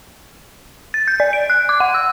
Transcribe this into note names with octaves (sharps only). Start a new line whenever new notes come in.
A6
G6
D5
D7
F#6
D6
F#5
E6